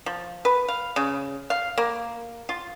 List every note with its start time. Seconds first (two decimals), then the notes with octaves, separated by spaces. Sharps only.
0.06 F3
0.45 B4
0.68 F5
0.96 C#3
1.50 F5
1.78 A#3
2.49 F4